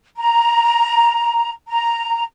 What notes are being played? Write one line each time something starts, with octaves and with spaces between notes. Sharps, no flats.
A#5
A#5